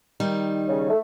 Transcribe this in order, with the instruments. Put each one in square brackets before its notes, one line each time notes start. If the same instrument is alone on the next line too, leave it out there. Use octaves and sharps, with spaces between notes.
[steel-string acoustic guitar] D#3 G3 D#4
[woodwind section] C#3
A3